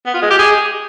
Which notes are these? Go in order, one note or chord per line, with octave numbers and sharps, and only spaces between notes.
B3
F4
G#3
G4
G#4